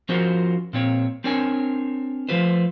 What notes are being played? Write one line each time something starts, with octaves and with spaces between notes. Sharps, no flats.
F3 C#4 F4 F#4 A#4 C5
A#2 C4 C#5
C4 D4 A#4 C#5 G#5
F3 A3 F4 B4 C5